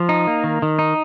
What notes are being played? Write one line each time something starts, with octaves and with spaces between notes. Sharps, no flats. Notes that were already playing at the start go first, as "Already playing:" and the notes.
Already playing: F3
D#4
A#3
D#3
D#3
D#4